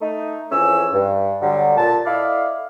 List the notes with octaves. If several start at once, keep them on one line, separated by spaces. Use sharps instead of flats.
A3 D#4
F2 E3 C#4 G#4 E6
G2
D3 F#3 G3
A#2 A5
E4 A4 D5 D#5 F5